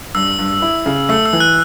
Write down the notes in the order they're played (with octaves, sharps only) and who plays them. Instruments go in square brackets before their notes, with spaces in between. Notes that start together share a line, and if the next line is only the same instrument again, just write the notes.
[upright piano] G2 [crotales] E6
[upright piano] G2
E4
C#3
[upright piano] A3 [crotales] E6
[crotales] E6
[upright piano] E3
[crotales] F#6